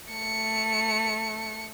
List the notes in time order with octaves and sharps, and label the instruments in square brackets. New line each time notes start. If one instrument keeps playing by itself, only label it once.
[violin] A3 C#7